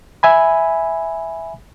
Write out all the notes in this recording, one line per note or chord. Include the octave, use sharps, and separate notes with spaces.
E5 G#5 B5